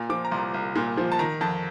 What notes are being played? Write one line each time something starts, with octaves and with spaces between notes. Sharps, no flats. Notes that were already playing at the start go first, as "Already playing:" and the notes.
Already playing: A#2
F3 D6
A#5
C2 C6
C2
A#2
F3
A5
D#3 A#5
F2 A5